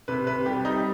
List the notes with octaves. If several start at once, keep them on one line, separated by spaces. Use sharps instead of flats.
C3 B4
C3 B4
G3 G4
G3 D#4